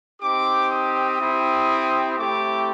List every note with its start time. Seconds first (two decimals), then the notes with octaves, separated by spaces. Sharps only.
0.21 C4 D#4 G4 D6
0.70 D#6
1.20 C4 E4 G4
2.18 A3 C4 E4 G4 D6